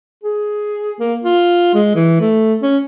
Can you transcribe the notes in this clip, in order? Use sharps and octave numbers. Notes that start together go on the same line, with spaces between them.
G#4
A#3
F4
G#3
E3
A3
C#4